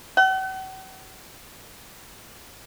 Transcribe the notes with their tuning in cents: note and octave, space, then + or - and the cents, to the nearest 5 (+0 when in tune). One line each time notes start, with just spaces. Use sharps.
F#5 +45